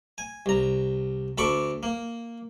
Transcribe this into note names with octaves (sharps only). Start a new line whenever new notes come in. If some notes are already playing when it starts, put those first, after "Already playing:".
G#5
C2 A#5
D2 A4 B5 C#6 D6
A#3